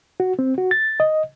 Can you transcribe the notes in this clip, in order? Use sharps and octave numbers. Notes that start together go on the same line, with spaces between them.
F#4
C4
F#4
A6
D#5